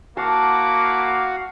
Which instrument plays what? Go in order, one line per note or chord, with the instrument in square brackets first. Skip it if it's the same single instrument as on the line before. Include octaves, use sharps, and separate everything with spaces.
[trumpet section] A#3 E4 D6 [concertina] F#4 F5 F#5 [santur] A5